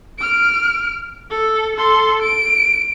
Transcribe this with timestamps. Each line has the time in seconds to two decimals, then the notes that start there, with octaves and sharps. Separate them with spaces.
0.19 F6 D7
1.30 A4
1.77 A4 C6
2.23 D7